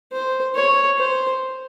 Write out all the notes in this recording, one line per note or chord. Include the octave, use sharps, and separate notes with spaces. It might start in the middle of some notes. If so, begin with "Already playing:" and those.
C5
C#5
C5